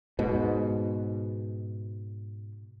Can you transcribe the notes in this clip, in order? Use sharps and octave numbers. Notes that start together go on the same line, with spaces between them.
G#2 B2